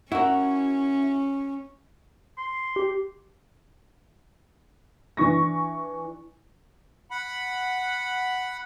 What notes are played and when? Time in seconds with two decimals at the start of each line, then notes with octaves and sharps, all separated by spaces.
0.12 C#4 E4 F#4 A#4
2.38 C6
2.76 G4
5.17 E3 D4 C#6 A#6
7.11 F#5 B5